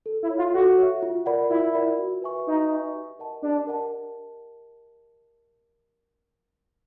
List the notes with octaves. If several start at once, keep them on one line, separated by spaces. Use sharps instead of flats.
A4
E4
C#5 E5
F4
F#4 A4
C#5 E5
F4
A#4 D5 F#5 B5
E4 F4
A#4 D5 F#5 B5
F#4
B4 E5 G#5 C#6
D#4 F#4
B4 E5 G#5 C#6
G4
A#4 D#5 F#5 A5
D4 G4
A#4 D#5 F#5 A5